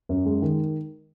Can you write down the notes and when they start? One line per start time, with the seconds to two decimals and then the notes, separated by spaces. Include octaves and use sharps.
0.09 F#2
0.26 G#3
0.42 D#3